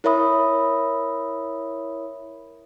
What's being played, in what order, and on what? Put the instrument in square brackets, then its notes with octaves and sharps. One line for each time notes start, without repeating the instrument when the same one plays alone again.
[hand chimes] E4 A#4 C#5 E5 B5 D#6